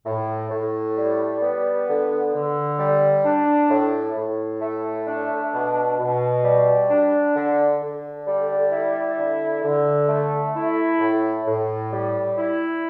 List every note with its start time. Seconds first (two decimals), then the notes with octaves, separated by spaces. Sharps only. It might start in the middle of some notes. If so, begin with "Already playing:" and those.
0.06 A2
0.51 A2
0.97 G3
1.42 B3
1.88 D3
2.34 D3
2.79 G3
3.24 D4
3.70 A2
4.16 A2
4.61 A3
5.07 D4
5.52 B2
5.98 B2
6.44 G3
6.90 D4
7.36 D3
7.81 D3
8.27 G3
8.72 E4
9.17 D3
9.63 D3
10.09 A3
10.54 E4
11.00 A2
11.46 A2
11.92 G3
12.36 E4